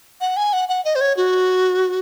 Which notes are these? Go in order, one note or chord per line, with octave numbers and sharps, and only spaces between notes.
F#5
G#5
F#5
F#5
D#5
C5
C#5
F#4